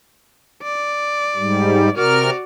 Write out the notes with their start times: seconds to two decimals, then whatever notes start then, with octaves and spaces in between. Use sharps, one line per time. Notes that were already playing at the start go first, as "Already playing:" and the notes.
0.63 D5
1.36 G#2 G3
1.96 C3 F#4 A#4 D5 F6